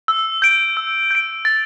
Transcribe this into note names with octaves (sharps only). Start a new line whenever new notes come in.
E6
G6 D7
E6
G6 D7
A6